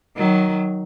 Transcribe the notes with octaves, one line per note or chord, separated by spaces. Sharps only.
D#3 F#3